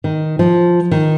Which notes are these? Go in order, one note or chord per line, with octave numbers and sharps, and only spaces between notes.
D#3
F3
D#3